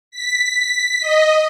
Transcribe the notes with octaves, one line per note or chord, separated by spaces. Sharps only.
B6
D#5